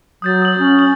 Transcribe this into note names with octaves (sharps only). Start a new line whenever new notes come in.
F#3 D#6 G6 A6
D#6 F#7
C#4
F#7